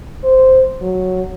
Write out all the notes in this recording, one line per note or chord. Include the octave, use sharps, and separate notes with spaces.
C5
F#3